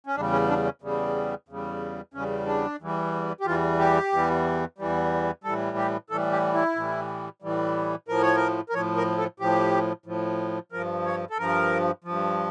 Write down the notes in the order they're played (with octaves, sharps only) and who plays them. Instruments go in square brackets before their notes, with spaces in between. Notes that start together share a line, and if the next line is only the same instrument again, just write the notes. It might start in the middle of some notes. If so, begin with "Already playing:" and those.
[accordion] C#4
E2 C#3 G3 D4
C#4
D4
C#4
E2 C#3 G3
E2 C#3 G3
E2 C#3 G3 C#4
D4
E2 E3 G3
G4
E2 E3 G3 F4
G4
E2 E3 G3
E2 E3 G3
A2 E3 G3 A4
G4
A2 E3 G3 A4
G4
E4
A2 E3 G3
A2 E3 G3
A2 F3 A#4
C#5
A#4
A#4
A2 F3 C#5
A#4
A4
A2 F3 G4
A2 F3
G2 F3 A#4
C#5
A4
G2 F3 A#4
G2 F3